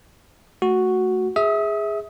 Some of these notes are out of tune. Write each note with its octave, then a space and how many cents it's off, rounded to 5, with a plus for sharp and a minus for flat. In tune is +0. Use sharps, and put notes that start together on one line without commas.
A3 +0 F#4 +0
G#4 -10 E5 -20 D#6 +20